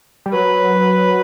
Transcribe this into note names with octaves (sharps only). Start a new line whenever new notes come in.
G3
F#3 B4